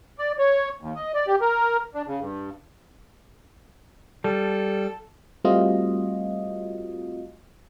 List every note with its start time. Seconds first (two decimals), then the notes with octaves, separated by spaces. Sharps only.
0.18 D5
0.38 C#5
0.81 D#2
0.95 D#5
1.14 D5
1.27 G4
1.41 A#4
1.94 D4
2.07 C#3
2.21 G2
4.24 G3 A4
5.44 G3 A3 C4 F4 F#4 D#5